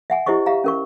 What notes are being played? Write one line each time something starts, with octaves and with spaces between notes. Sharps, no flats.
E5 F#5 G#5
E4 G4 C5 D#5 C#6
G4 E5 F5 A#5
C#4 A#4 C#6